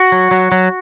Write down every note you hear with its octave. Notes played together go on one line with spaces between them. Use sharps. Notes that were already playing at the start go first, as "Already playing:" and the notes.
Already playing: F#4
F#3
F#3
F#3